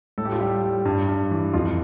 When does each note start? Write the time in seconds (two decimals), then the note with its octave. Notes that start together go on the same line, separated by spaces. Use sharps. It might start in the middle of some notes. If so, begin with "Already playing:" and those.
0.18 A2 A4
0.25 G4
0.33 F4
0.40 G3 G4
0.63 G3
0.85 G2
1.08 G2
1.31 E3
1.53 F2 F4